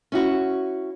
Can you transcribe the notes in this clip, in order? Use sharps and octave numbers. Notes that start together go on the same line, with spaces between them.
C#4 E4 F#4